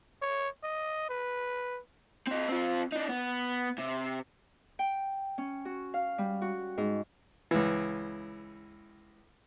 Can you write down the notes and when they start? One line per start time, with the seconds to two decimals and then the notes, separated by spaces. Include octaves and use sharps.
0.22 C#5
0.64 D#5
1.10 B4
2.27 C4 D#5
2.48 C4 F4
2.92 D4 D#4
3.09 B3
3.78 C3
4.79 G5
5.38 C#4
5.65 F#4
5.94 F5
6.18 G3
6.42 F#4
6.78 G#2
7.51 C#2 E3